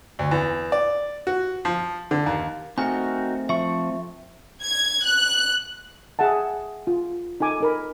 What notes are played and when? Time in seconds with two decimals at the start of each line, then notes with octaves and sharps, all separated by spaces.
0.19 D2
0.31 E2
0.72 D5
1.27 F#4
1.65 F3
2.11 D3
2.26 D#2
2.78 A3 C4 D#4 F#4 A#4 G#5
3.49 F3 E5 C#6
4.63 G#6
5.05 F#6
6.19 G#4 E5 F#5 A5
6.87 F4
7.40 D#4 A4 G#5 D6
7.60 D#4 A#4 B5